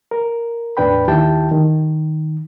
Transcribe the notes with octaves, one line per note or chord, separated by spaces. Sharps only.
A#4
E2 A2 D4 B4 G5 B5
D#2 D#3 E4 G4 G5 A5
D#3